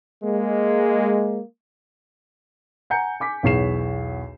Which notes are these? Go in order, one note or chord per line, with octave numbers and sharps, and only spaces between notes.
G#3 A#3
F#5 G#5 A#5 G6 C#7
G#5 D6 B6
B1 E2 C#5 C7 E7